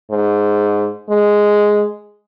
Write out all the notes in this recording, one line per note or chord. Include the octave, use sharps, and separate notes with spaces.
G#2
G#3